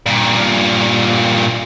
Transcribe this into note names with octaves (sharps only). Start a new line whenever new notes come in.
G2 A#2